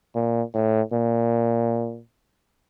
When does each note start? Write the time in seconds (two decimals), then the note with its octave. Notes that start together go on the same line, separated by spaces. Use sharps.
0.15 A#2
0.54 A2
0.93 A#2